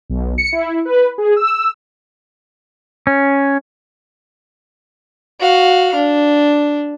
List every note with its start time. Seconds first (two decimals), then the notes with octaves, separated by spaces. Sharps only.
0.10 B1
0.38 C#7
0.52 E4
0.85 B4
1.18 G#4
1.37 E6
3.07 C#4
5.40 F#4 F5
5.95 D4